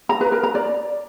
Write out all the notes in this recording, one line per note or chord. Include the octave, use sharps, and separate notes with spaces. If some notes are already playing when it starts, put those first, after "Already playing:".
A#5
B4
A#4
A#5
D5